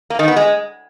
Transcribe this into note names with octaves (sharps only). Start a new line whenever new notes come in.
A#3
D#3
B3
G#3